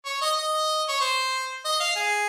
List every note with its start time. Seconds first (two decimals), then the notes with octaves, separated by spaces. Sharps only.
0.06 C#5
0.21 D#5
0.38 D#5
0.88 C#5
1.01 C5
1.65 D#5
1.80 F5
1.96 G#4